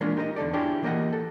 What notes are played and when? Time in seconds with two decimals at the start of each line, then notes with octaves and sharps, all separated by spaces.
0.01 E3 G#3 A#3 C#4 D4 F4
0.17 D#4 G4 A#4 B4 D#5
0.36 E2 D3 A4 D5
0.53 D4 E4 F4 G4 G#4 C#5
0.83 E3 A#3 G4 A#4 D#5 F#5
1.13 A4